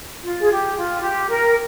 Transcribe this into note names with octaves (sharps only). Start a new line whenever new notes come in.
F4
G#4
G4
F4
G4
A#4